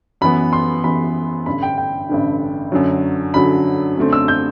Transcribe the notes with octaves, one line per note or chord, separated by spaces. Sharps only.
F#2 E3 B3 B5
C6
F#2 E3 B3 B5
A1 G2 D3 B5
G5
G5
A1 G2 D3
F#2 D3 F#3
F#2 D3 F#3 B5
F#2 D3 A3 C4
E6
G6